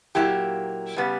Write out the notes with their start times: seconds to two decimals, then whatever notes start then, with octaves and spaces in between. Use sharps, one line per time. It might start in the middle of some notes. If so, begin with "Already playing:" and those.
0.15 A#2 F#3 A#3 E4 G4
0.96 C#3 G3 B3